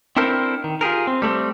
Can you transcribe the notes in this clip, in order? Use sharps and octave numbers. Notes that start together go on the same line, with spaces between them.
C4 D4 E4 A4 A#4 C5
D#3
F4 G4 G#4 A#4
C4
G3 A3 A#3 C4